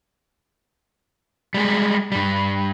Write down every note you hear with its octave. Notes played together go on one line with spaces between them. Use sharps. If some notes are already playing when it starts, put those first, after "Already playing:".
G3 G#3
G2 G3